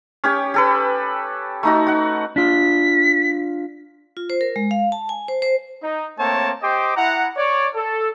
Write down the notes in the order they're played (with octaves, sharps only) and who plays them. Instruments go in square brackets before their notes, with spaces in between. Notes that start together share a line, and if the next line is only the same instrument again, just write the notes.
[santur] C#4 G4 C#5
G4 A4 B4
A3 D#4 F#4
F#4 F#5
[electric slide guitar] D4 F4 [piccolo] B6
[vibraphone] F4
C5
A#4
G#3
F5
A5
G#5
C5
C5
[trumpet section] D#4
A3 A#3 C4 C#5 G5 A5
G4 C5 D#5 G5 C6 D6
E4 F#5 A#5
C#5 D5
A4